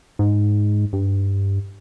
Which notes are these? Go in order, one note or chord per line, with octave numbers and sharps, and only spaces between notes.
G#2
G2